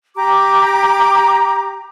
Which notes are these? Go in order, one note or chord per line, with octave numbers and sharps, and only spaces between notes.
G4 A#5 D6